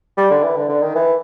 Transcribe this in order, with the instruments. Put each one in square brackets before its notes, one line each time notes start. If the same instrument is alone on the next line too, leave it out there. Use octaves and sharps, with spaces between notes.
[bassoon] G3
D3
E3
D3
D3
D#3
E3